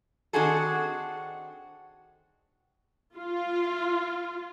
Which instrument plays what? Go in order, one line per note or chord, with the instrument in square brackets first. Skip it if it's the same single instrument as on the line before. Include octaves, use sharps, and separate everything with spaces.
[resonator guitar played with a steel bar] D#3 C4 D4 F#4 G#4 A4
[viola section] F4